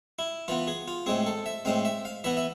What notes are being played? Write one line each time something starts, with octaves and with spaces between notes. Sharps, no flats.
E4
E3 B3 F4
G#4
F4
A2 G#3 C4 G#4
A4
E5
A2 G#3 C4 F5
E5
F5
E3 B3 E5
E5